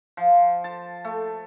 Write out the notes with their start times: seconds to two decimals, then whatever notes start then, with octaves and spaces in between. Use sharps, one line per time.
0.17 F3
0.64 A5
1.05 A3